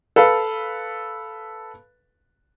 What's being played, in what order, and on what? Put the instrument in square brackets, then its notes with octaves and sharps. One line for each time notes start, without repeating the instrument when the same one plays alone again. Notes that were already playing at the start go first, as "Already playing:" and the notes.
[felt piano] A4 B4 F5